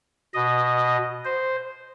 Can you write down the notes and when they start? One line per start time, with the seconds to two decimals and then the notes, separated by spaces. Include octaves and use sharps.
0.34 B2 D#5
1.24 C5